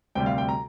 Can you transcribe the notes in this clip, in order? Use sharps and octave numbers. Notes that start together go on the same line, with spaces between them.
D2 C3 G3 G5
F5
G5
A#5